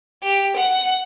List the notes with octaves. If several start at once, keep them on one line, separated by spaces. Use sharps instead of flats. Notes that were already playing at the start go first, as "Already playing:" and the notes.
G4
F#5